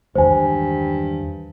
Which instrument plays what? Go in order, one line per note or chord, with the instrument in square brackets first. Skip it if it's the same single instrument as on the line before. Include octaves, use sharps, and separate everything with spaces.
[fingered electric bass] E2 D#3 G#3 [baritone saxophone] G2 [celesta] C5 G#5